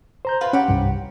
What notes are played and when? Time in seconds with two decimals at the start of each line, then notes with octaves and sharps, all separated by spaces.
0.25 C5 A#5 G6
0.41 F4 A#4 B4
0.53 C#4 G4 F#5
0.68 C2 G2